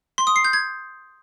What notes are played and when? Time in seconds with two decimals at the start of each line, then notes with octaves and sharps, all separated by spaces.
0.18 C6
0.27 D#6
0.36 C7
0.45 G6
0.53 G#6